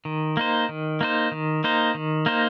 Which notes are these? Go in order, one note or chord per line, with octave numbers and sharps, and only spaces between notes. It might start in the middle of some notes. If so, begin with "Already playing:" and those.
D#3
A#3 D#4 C5
D#3
A#3 D#4 C5
D#3
A#3 D#4 C5
D#3
A#3 D#4 C5